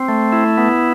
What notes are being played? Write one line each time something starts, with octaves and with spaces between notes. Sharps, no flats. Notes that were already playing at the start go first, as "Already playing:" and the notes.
Already playing: C4
A3
E4
B3